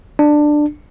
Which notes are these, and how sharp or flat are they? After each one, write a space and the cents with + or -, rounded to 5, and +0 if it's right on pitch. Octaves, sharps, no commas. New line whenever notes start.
D4 +15